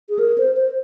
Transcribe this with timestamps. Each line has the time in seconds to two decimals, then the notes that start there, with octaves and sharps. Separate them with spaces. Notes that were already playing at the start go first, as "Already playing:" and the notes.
0.09 G#4
0.19 A#4
0.38 C5
0.57 C5